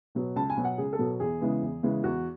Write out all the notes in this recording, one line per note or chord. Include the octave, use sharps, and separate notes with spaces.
B2 F#3 B3
C#2 A5
G#5
B2 F#3 B3
F#5
C#2 G#4
A4
B2 F#3 B3
E2 G#4
C#3 E3 G#3 B3
E2
C#3 E3 G#3 B3
E2 F#4